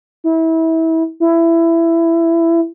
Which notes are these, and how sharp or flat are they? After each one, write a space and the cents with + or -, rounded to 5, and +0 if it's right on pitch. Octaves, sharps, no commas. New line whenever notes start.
E4 -25
E4 +15